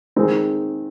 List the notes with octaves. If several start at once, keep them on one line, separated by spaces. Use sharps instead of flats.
D#3 G#3 C4 D#4